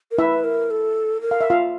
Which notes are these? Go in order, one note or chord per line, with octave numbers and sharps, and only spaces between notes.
A#4
E4 B4 E5
A#4
A4
A#4
F5
E5
F4 F5